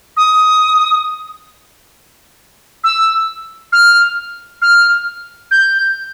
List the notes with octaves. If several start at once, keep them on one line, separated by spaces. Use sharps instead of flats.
D#6
E6
F6
F6
G6